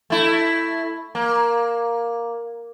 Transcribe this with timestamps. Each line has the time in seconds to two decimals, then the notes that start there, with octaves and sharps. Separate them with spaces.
0.10 A3 E4
1.15 A#3